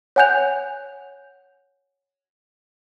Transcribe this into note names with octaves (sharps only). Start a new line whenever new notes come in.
C#5 F#5 G#5 F#6 G6 F7